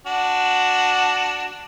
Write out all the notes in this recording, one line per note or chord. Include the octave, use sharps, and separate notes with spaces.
D4 F#4